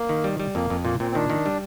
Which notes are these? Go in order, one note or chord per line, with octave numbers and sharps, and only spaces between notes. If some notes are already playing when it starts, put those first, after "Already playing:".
Already playing: A#3
D#3
G3
G3
F2 A#3
F2
A#2 A#3
A#2 C4
C4
D#3 D4
D#3
G3